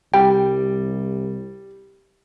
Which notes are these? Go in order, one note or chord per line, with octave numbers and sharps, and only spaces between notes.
C2 G3 G5